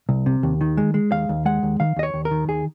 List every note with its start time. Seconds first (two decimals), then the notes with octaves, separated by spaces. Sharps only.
0.09 C2
0.26 C3
0.43 D#2
0.61 D#3
0.77 G#3
0.94 G#3
1.12 D#2 F5
1.29 D#2
1.45 G#3 F#5
1.63 D#2
1.80 D#3 F5
1.96 D#2 D#5
2.03 C#5
2.14 D#2
2.25 A#4
2.31 D#3
2.48 D#2 G#4